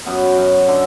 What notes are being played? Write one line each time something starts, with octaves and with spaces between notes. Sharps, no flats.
F#2 B3
F#2
D3